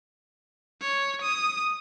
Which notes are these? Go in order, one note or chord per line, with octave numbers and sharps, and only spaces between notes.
C#5
D#6